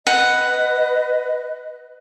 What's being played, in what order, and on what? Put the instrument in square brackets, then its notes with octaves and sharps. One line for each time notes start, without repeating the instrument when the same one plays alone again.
[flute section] B4 D#5 [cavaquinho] F#5